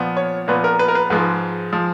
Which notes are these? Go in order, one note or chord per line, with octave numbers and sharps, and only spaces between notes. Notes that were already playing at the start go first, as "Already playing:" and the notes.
Already playing: A#2 F3 B3
C#5
A#2 F3 B3 B4
A#4
B4
A#4
B4
G#2 F3 G#3 B4
F3 G#3